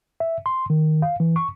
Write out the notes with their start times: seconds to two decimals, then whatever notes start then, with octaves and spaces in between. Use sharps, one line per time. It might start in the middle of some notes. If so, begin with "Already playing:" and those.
0.20 E5
0.46 C6
0.70 D#3
1.02 F5
1.20 E3
1.36 C#6